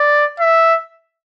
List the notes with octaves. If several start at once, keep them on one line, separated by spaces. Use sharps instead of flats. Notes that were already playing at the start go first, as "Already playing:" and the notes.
Already playing: D5
E5